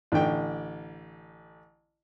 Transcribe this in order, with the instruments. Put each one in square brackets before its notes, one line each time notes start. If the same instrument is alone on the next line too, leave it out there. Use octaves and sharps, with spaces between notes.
[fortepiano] A1 D3 G5